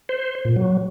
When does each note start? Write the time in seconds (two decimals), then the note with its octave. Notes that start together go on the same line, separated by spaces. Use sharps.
0.09 C5
0.45 A#2
0.56 F#3